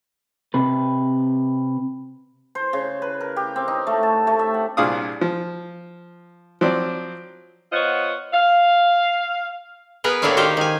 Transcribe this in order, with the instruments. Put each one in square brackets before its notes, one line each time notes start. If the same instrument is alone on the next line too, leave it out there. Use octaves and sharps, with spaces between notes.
[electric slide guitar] C3 B4
[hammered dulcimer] C5
C#3
B4
A#4
G4
C4
D#4
A3
A5
A3
E5
F#5
[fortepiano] C2 A#2 D4 G#4 F5 D#6
F3
F3 F#3 C4 D5
[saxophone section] B3 F4 C5 C#5 D#5 F#5
F5
[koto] B3 G#4 A#4 B4
A2 A#3 D4 E4 C#5 F5
D#3 D#4 G4 C5
D#3 G#5